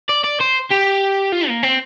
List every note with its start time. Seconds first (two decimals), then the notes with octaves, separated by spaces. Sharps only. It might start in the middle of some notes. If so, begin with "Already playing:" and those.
0.09 D5
0.24 D5
0.40 C5
0.71 G4
1.32 F4
1.48 A#3
1.63 C4